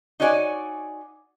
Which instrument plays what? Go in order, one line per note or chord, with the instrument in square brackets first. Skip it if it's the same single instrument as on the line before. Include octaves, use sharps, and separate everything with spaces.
[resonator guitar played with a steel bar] D#4 F#4 C#5 D5 G#5